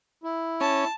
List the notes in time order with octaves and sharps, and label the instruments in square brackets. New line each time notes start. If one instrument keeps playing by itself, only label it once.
[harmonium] E4
[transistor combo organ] C#4 [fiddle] A5